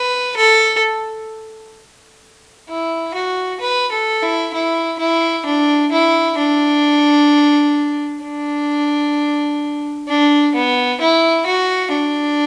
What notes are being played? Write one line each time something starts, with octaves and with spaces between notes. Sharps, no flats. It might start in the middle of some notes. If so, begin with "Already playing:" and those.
Already playing: B4
A4
E4
F#4
B4
A4
E4
E4
E4
D4
E4
D4
D4
D4
B3
E4
F#4
D4